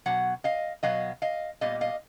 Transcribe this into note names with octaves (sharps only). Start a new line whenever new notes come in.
B2 F#3 F#5
D#5 F5
B2 F#3 B3 D#5 F5
D#5 F5
A#2 G3 B3 D#5 F5
D#5 F5